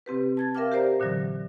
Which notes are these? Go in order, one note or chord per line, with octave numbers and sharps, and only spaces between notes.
C3 C4 G4 B4
A5 G#6 A6
A#4 E5 F5 G5 D6 F6
G4 A#4 C5 D5 A#5
A#2 D3 E3 F#3